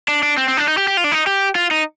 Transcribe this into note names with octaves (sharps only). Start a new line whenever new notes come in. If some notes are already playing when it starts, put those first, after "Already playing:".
D4
D4
C4
C4
D4
D#4
G4
G4
F4
D4
D#4
G4
F4
D#4